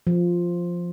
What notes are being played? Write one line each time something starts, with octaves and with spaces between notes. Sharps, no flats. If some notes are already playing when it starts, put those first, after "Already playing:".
F3